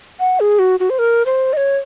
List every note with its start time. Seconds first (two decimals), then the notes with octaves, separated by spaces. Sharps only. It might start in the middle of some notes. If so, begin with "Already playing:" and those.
0.20 F#5
0.40 G#4
0.59 F#4
0.80 F#4
0.90 C5
0.99 A#4
1.26 C5
1.53 D#5
1.57 C#5